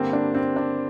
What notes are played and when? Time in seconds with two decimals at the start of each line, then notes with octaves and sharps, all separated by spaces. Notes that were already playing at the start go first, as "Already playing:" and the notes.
Already playing: G2 D3 G3 A#3 C4
0.13 D4
0.35 C4
0.56 D4